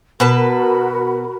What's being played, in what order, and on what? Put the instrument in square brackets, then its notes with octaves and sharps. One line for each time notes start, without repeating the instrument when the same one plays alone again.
[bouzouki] B2 B4 A5 [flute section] F#4 A#4 B5